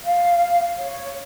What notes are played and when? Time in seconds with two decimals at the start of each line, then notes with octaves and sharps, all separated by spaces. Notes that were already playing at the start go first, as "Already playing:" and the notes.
0.04 F5
0.77 C#5